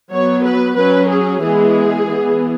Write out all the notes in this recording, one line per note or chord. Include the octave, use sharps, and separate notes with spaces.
F#3 B3 C#5
B4
F#3 C#4 B4
G#4
E3 G#3 B3 G#4
E3 B3